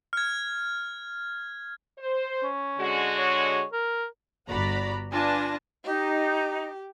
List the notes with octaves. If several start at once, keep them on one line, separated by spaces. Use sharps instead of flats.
F6 G#6
C5
C#4
D3 G#3 F#4
C#5
A#4
G1 F#4 D5 A#5 B5
D4 F4 B4 G#5 A5 A#6
D#4 G4